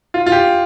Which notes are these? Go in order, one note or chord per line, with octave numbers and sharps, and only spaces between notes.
F4
F4
G4